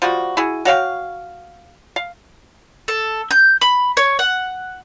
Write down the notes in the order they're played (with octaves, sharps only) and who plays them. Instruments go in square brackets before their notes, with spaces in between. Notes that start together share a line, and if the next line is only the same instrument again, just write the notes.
[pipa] F3 G3 F#4
E4 F#4 G#4
F#4 C#5 F5 G5
F5
[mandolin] A4
G6
B5
C#5
F#5